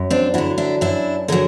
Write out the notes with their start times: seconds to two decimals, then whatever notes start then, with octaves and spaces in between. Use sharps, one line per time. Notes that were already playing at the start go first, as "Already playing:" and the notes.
Already playing: F#2
0.10 C4 D4
0.34 D3 F#3 D4 E4
0.58 D4 E4
0.81 F#2 D4 E4
1.28 D3 F#3 G#4 A#4